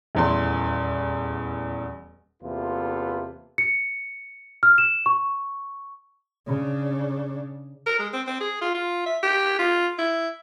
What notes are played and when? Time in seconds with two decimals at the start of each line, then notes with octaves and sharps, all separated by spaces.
0.15 D#1 E2 C6
2.42 E2 C3 A#3 F4 A4 B4
3.58 C#7
4.63 F6
4.78 E7
5.06 C#6
6.47 C#3 D4
7.86 A#4
7.99 G#3
8.13 C4
8.27 C4
8.41 G#4
8.61 F4
8.75 F4
9.06 E5
9.23 G4
9.59 F4
9.98 E4